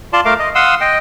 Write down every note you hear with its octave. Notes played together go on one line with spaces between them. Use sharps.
F4 D5 A5 C6
A3 A#4 F5 D6
D#5
F5 F#5 C6 D#6 E6
D#5 G5